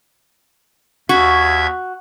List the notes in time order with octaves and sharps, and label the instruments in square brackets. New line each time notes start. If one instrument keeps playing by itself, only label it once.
[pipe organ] D#2 E5 G#6 [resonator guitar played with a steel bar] F#4